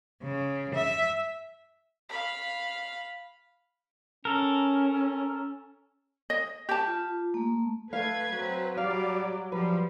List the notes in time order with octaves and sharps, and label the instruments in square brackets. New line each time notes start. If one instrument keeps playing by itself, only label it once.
[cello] C#3
E5
[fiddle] F5 B5
[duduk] C#4 [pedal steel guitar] A4 A#4
[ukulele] D#5
G4 A5
[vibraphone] F4
A3 A#3
[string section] A3 G#6 [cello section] B4 [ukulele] F5
[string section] F#3 [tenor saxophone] C4
[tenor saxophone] G3 [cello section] D5 [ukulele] F5
[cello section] F3 [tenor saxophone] G3 [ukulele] B4